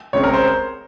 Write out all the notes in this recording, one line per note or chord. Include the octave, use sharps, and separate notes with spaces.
C#2 C#3 G#3 C4 C#5
A#4
C5